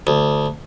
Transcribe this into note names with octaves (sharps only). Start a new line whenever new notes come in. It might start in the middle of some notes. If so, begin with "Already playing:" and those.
D2